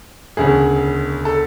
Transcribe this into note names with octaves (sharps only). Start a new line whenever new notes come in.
E1 D2 C#3 G#4
A4